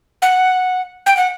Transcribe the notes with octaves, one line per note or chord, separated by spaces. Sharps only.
F#5
G5
F#5